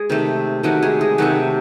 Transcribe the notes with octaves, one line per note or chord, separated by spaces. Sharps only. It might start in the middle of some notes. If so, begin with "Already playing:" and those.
Already playing: G#3 G#4
C3 D#3 A3
C3 D#3 F#3 A3 F#4
G#3 G#4
G#3 G#4
C3 D#3 F#3 A3 F#4